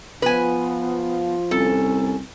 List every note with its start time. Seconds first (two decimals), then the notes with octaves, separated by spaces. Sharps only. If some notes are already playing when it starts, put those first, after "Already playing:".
0.22 F3 B3 F4 B4 G#5
1.51 C2 C#4 A4